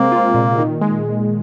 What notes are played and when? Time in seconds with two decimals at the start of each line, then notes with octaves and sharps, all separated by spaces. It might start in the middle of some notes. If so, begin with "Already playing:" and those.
Already playing: C3 G#3 A#3 C4
0.12 F4
0.34 A#2
0.58 D#3
0.81 G#3